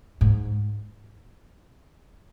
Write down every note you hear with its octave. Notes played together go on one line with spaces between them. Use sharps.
G#2